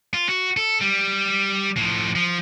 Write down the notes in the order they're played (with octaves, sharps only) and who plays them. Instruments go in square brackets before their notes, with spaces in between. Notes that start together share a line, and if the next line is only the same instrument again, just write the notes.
[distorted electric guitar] F4
F#4
A4
G3
A2 F3
F3